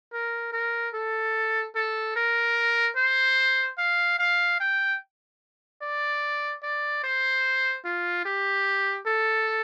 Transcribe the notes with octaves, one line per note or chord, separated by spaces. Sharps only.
A#4
A#4
A4
A4
A#4
C5
F5
F5
G5
D5
D5
C5
F4
G4
A4